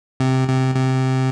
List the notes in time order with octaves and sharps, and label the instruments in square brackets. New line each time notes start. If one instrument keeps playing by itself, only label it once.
[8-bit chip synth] C3
C3
C3